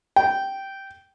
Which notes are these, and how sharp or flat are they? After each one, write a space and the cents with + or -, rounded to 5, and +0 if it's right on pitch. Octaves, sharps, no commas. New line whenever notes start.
G5 -10